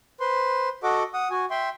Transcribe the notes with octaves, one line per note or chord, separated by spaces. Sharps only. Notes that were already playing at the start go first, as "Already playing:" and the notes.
B4 C5 C6
F#4 A4 D#5 F#5 D6
F#5 D#6
F#4 G#5
E5 G5 C6